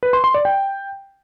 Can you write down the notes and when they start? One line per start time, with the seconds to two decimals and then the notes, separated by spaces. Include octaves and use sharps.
0.03 B4
0.13 C6
0.24 C6
0.34 D5
0.45 G5